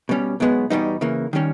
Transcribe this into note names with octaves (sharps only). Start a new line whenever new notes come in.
B2 G3 C#4
B1 B2 G#3 B3
E2 B2 G3 B3 D#4
C#3 E3 A#3
D#3 G3 C#4